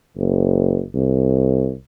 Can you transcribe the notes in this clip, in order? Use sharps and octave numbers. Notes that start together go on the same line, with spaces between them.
F#1
C2